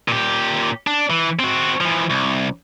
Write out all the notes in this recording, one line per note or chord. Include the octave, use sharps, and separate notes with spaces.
A#2 G4
D4
E3
C4 F#4
E3 F3
C2